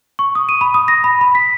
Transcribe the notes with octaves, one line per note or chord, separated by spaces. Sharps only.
C#6
D#6
D#7
B5
D#6
A#6
B5
B5
B6